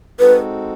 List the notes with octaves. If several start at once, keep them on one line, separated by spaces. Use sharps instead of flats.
G#3 C4 D#4 F#4 A4 B4